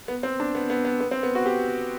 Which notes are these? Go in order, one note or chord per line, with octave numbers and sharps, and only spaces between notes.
B3
C4
D4
B3
B3
B3
B3
C4
B3
F#4
G4